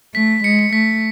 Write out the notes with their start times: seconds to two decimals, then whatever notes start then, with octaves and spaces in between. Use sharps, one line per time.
0.14 A3 B6
0.44 G#3 C#7
0.59 C#7
0.73 A3 B6